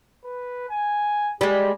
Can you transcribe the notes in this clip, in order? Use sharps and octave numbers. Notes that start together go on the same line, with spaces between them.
B4
G#5
G3 G#3 G4